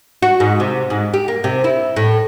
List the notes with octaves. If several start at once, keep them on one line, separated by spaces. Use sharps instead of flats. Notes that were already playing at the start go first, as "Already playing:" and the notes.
F#4
G#2
C3
G#2
G4
A#3
C3
E4
A2